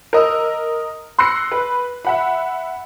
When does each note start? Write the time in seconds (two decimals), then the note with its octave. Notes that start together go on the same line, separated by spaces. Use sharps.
0.13 A#4 D#5 E6
1.19 C6 E6 F#6 A#6 C7 C#7
1.52 B4
2.05 E5 F#5 B5